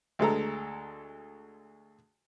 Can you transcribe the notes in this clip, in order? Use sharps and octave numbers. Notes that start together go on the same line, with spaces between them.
D2 G#3 A4 A#5